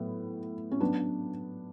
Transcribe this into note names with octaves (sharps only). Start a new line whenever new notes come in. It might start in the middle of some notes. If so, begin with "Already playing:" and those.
Already playing: A2 F#3 B3
C#4
F#3 B3 D4